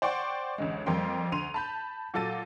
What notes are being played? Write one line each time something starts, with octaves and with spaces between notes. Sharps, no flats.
C5 D5 F#5 G5 C#6
A1 D2 G#3
F2 G3 A#3 G5 C6
D2 C6 D#7 F7
A5 B5 G6
A#2 F#3 A4 A6 D#7